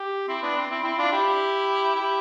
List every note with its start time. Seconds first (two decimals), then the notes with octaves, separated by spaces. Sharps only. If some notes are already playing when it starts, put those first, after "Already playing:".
Already playing: G4
0.28 C4 E4
0.42 B3 D4
0.56 C4
0.70 C4 E4
0.84 C4 E4
0.98 D4 F4
1.12 E4 G4
1.95 E4 G4